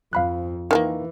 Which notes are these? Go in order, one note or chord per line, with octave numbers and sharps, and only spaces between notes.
F2 F5 B5 F#6
D#3 E3 A3 A#3